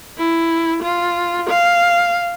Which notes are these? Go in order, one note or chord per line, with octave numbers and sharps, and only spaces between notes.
E4
F4
F5